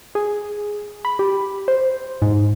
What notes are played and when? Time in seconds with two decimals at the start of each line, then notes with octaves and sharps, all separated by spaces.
0.15 G#4
1.05 B5
1.19 G4
1.68 C5
2.22 G#2